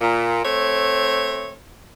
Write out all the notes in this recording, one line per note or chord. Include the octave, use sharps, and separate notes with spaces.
A#2
A3 C4 C#5